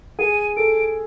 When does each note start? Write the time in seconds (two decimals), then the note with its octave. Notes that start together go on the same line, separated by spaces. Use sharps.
0.19 G#4 D#7
0.57 A4 D7